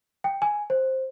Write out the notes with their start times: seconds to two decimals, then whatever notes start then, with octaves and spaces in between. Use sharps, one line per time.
0.24 G5
0.42 G#5
0.70 C5